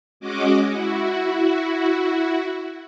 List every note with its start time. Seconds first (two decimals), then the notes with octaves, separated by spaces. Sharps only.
0.20 G#3 C#4 F#4 D#5 D6
0.70 E4 F#4